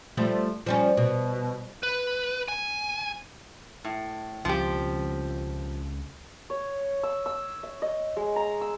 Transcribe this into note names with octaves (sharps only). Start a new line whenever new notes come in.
F3 G3 A3
F3 G3 C#4
B2
B4
G#5
A2
C#2 C#3 F3 C4 G4
C#5
E6
E6
E5
D#5
G#3
A#5
E6